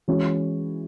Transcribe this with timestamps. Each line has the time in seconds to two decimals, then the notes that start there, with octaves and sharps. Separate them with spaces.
0.08 E3 G#3 C#4 F#4 C#5